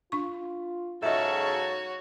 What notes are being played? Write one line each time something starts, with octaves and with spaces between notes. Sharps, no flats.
D4 F4 C#6
G#2 C#3 F#3 F#4 A4 C#5 D#5 E5